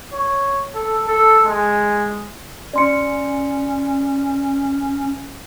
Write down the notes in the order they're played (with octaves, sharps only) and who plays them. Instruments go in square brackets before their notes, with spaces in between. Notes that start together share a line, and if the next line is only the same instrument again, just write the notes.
[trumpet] C#5
A4
A4
G#3
[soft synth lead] C#4 [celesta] D5 C6 C#7